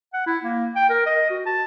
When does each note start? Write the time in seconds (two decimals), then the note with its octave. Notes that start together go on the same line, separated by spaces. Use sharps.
0.14 F#5
0.26 E4
0.43 A#3
0.76 G5
0.90 A#4
1.06 D#5
1.30 F#4
1.46 A5